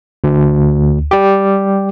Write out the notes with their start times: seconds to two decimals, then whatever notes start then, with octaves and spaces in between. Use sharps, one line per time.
0.24 D2
1.11 G3 G4